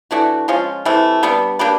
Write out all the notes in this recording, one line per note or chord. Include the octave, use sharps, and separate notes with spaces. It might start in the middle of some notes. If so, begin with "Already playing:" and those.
E3 A3 D4 F#4
F3 G#3 C#4 F4
C3 E3 A3
G3 B3 D4
A#3 D4 G4 B4